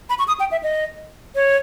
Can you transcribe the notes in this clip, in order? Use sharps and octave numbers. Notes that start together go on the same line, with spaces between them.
B5
C#6
D#6
G5
E5
D#5
C#5